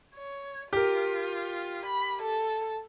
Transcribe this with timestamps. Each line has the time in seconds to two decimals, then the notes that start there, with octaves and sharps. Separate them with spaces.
0.15 C#5
0.73 F4 G4 A#4
1.86 B5
2.22 A4